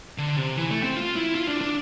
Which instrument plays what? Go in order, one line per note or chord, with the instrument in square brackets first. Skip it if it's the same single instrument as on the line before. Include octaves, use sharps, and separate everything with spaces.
[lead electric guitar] D3
C3
E3
A3
C4
F4
E4
F4
D4
D4